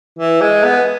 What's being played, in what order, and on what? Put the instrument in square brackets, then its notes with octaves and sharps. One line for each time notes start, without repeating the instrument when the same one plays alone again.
[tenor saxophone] E3
G#3
B3